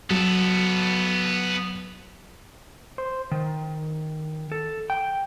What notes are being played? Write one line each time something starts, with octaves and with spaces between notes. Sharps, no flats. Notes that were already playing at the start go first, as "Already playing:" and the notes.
F#3 B3 A4
C5
D#3
A4
G5